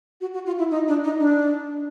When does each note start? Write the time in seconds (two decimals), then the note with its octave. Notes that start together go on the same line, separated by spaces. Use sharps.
0.21 F#4
0.34 F#4
0.46 F4
0.58 E4
0.71 D#4
0.88 D4
1.04 D#4
1.20 D4